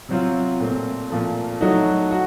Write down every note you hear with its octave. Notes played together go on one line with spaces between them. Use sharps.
C3 F#3 C4 F4
A#2 A3 C4
A#2 F3 A3
F#3 A3 D#4 F#4
F#4